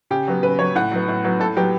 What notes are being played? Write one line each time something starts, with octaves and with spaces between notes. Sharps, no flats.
C#3 G4
F#3 B3
C#3 B4
F#3 B3 C#5
A2 F#5
F#3 B3
A2
F#3 B3
A2 A4
F#3 B3 G4